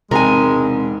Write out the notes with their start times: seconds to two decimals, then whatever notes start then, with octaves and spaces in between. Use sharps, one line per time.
0.11 E1 G#2 C3 G#3 C4 A#4 G#5